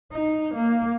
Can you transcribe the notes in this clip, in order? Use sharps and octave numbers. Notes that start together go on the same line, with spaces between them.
D#4
A#3